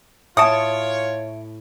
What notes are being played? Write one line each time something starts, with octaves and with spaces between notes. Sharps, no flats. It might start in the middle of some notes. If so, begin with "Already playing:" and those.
A2 F4 C#5 E5 A5 D#6 C#7 D7